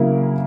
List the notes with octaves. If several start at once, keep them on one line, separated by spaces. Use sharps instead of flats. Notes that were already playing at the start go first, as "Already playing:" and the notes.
Already playing: C#3 F#3 A#3 E4